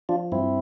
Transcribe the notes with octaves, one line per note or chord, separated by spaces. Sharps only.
F3 D4 F4
G2 C4 E4